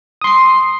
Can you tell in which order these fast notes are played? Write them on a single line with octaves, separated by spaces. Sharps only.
D#6 C6 C7